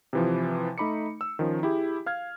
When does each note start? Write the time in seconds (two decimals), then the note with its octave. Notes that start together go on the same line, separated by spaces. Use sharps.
0.13 C3 E3 F3
0.78 A3 D#4 B5 D6 C#7
1.21 E6
1.39 D#3 F3 C#4
1.63 E4 G4 G#4
2.06 F5 F6 G#6